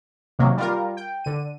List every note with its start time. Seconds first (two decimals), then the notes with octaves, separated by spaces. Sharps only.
0.39 C3 D#3 F#3 A#3
0.57 G3 F4 A#4
0.97 G5
1.24 D3 D#7